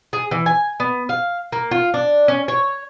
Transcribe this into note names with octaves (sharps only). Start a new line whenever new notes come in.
G#4
E3
G#5
B3
F5
A#3
F4
D4
C#4
C#5